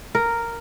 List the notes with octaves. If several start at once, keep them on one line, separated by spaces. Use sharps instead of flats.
A#4